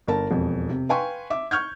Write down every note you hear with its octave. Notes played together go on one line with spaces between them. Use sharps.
G1 A#4 A5
E1 F2
C3
B4 F5 G5 G#5 C6 C#6
E5 D6
C#6 F6 G6 G#6